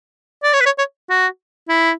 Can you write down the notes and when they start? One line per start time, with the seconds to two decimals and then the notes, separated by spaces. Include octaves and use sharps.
0.43 D5
0.53 C#5
0.61 B4
0.66 C#5
0.78 C#5
1.10 F#4
1.69 E4